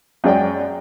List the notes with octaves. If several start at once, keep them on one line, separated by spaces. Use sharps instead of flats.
F#2 G#3 D5 G5